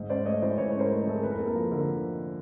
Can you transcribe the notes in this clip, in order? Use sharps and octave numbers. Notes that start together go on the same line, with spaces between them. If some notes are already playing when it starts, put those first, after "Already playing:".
Already playing: G#2
C#4 C5 D5
A3 C#5 D#5
E3 C5 D5
G#2 B4 C#5
B4 C#5
C#4
A#4 C5
A3
E3 A4
A#4
F2 A4 B4
A#4
A#3 A4
A#4
F3 A4
D3 A#4